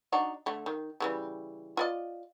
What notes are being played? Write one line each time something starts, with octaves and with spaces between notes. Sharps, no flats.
D4 D#4 F#4
D3 A3
D#3
C#3 E3 G3
F4 D5 D#5